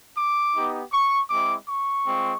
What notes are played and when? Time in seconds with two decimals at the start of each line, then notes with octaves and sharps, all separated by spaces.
0.17 D6
0.55 B3 D#4 G4
0.92 C#6
1.30 G#3 C4 E4 D6
1.67 C#6
2.05 G#3 C4 F4